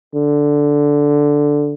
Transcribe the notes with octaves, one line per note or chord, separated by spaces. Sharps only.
D3